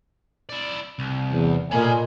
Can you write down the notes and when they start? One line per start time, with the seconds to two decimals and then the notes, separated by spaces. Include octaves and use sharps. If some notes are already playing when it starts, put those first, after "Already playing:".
0.49 E4 D5
0.99 C2
1.32 E2
1.71 A#2 A4 C#5 D#5 G#5 B5